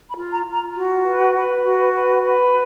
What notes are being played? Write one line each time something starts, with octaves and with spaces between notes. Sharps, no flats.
B5
F4
A#5
F4
A#5
F#4
B4
B4
F#4
B4
B4